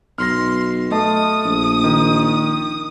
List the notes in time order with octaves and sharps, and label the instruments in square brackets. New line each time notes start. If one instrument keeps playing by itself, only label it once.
[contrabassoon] B1 [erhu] C6 [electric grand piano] F6 A#6
[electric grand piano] A3 D#5 A5 [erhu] D#6
[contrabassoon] A#1
[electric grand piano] D#3